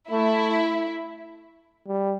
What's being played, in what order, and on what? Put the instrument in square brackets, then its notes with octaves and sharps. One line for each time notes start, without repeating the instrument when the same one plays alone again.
[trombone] A3 [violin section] E4
[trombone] G3